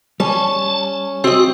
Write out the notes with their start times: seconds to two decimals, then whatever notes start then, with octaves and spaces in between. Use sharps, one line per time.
0.20 G3 C#4 A5
1.24 C4 F#4 D#5